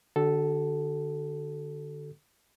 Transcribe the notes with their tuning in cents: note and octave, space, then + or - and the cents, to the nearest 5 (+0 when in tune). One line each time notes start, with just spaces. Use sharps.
D3 +15 F#4 +40 A4 +0